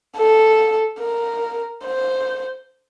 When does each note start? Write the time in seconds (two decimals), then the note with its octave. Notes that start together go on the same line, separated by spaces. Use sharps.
0.17 A4
1.00 A#4
1.85 C5